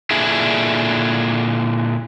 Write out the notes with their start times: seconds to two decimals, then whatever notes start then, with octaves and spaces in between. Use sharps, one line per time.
0.11 A#2 D3 D4 E4 G#4